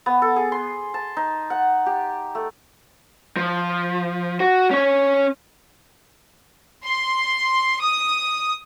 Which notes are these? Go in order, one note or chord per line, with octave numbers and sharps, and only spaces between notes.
B3
A4
G#4
C6
A5
D#4
F#5
G4
A3
F3
F#4
C#4 C#5
C6
D#6